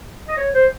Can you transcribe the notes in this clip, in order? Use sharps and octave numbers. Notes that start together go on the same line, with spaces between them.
D#5
C#5
C5